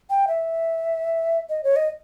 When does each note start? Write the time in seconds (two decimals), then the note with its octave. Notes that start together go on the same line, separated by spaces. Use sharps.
0.10 G5
0.28 E5
1.49 D#5
1.64 C#5
1.76 D#5